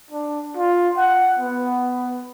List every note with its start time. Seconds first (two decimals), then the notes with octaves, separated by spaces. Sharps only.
0.11 D4
0.57 F4
0.97 F#5
1.39 B3